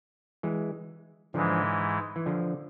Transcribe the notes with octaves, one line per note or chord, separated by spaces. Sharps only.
E3 G#3
G#2 D3 E3 F3 G#3
E3
D3 F3